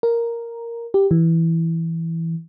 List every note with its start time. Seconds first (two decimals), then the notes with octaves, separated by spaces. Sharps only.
0.03 A#4
0.94 G4
1.11 E3